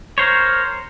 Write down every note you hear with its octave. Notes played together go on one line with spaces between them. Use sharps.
A#4 C5 C#5